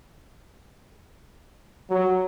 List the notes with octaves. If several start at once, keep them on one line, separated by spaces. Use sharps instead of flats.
F#3